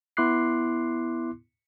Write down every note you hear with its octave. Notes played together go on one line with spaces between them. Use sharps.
B3 E4 C6 D6 F#6 C7